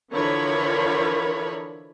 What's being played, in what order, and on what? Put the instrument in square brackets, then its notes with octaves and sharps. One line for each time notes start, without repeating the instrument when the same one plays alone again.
[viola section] D3 E3 F3 A#4 C#5 B5